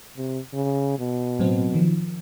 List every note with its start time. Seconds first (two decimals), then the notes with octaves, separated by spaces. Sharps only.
0.18 C3
0.54 C#3
0.99 B2
1.39 A2 F#3 C4
1.74 D#3 F3